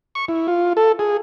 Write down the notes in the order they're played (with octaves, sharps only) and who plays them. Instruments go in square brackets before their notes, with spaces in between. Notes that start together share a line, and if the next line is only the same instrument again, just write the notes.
[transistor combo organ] C#6
E4
F4
A4
G#4